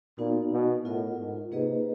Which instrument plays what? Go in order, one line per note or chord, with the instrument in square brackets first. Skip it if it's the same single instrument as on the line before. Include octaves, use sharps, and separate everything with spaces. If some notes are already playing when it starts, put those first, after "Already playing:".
[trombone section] A#2 [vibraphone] B3 D#4 F#4
[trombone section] B2
[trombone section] A2 [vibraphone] F4 A#4 D#5 F#5
[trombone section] G#2
[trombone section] C3 [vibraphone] A#3 D#4 G#4 B4 D#5